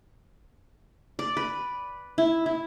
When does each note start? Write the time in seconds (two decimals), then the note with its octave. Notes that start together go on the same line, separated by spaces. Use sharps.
1.19 D5
1.37 B4
2.18 E4
2.46 E4